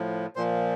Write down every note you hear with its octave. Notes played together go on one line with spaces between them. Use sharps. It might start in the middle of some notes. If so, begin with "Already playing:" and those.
Already playing: A2 F3
A#2 F3 C5